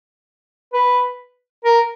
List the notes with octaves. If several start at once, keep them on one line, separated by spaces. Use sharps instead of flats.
B4
A#4